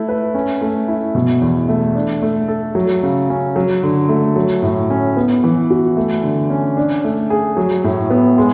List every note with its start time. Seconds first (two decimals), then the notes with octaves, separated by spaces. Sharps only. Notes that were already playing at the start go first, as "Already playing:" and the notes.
Already playing: A3 E4
0.09 B4
0.34 C#4
0.61 A3
0.88 E4
1.15 B2
1.42 E2
1.69 A3
1.95 D4
2.22 A3
2.48 A4
2.75 F#3
3.03 C#3
3.30 C#4
3.56 F#3
3.83 D3
4.09 A3
4.36 F#3
4.63 A2
4.90 C#4
5.17 B3
5.44 E3
5.70 F#4
5.97 A3
6.23 D3
6.50 C#4
6.77 D4
7.04 A3
7.30 G#4
7.57 F#3
7.84 A2
8.10 B3
8.38 G#3